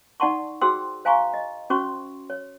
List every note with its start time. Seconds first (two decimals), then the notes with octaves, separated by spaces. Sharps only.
0.20 D#4 D5 F#5 A5 C6 C#6
0.61 F#4 G#4 C5 G5 C6 E6
1.05 C5 F5 G#5 A#5 C6 C#6
1.34 D#5
1.70 C#4 F#4 C5 C6 C#6
2.30 C#5